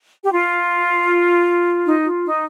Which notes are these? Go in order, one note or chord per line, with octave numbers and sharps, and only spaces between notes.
G4
F4
D#4
F4
D#4